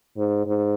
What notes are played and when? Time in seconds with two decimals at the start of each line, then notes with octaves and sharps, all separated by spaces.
0.17 G#2
0.46 G#2